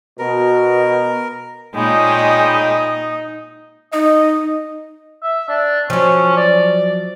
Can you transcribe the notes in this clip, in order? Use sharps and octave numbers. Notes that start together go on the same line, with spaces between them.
B2 A#4
A#2 G#3 D#4 C#5 G5 B5 D#6
D#4 D#5
E5
D4
F3 F#3 C#4
D5